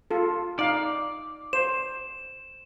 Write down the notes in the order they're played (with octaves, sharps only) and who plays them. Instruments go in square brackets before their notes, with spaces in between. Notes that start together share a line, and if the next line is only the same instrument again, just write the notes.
[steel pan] F4 A4
[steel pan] D#4 F5 [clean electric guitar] D5
[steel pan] C5 [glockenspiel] E7